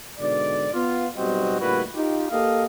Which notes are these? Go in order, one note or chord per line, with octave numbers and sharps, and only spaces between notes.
G#2 B2 D3 D5
B3 F4
B1 B2 G3 C4 F#4 D#5
D2 A#2 G3 E4 F#4 B4
D#4 F4 G4
A#3 G4 A4 D#5 F5